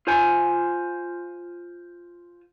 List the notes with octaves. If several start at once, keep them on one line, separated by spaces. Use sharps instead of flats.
F4 C5 G#5